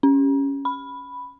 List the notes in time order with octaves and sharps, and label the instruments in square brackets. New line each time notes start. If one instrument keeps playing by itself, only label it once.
[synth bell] C#4
B5